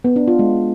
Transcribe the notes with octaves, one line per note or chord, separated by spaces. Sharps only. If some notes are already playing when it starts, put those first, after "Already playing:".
B3
D4
F4
G#3